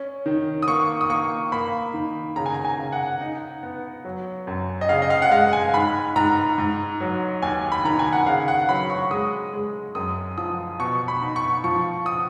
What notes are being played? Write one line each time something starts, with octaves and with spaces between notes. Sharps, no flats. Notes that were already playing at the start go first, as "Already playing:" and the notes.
Already playing: C#4
D#3
D#6
A#3 C#6
D#6
A#3 C#6
A#3 B5
D#3
C#3 A#5
G#5
A#5
G#5
C#3
F#5
D#4
B3
F#3
F#2
D#5
C#3 F5
D#5
F5
F#5
G#3 F5
G#5
G#2 B5
G#2 A#5
G#2
F#3
D#2 G#5
B5
D#3 A#5
G#5
F#5
C#3 F5
F#5
F#3 B5
C#6
G#3 D#6
G#3
F#2 D#6
F3 D#6
B2 C#6
B5
D#4
C#6
F3 C#6
D#6